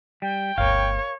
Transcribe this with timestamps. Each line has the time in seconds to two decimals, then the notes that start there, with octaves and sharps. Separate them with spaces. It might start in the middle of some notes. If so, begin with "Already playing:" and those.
0.22 G3 G5
0.58 G1 D2 A#4 C#5 F5